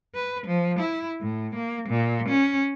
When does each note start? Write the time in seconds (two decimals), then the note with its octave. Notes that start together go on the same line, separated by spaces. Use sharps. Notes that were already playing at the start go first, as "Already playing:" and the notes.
0.15 B4
0.47 F3
0.79 E4
1.21 A2
1.55 A#3
1.89 A#2
2.29 C#4